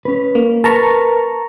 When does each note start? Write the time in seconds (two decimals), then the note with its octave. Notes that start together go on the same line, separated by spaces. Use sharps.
0.05 C#4 B4
0.35 A#3
0.64 A#4 B4 A5 A#5 C#6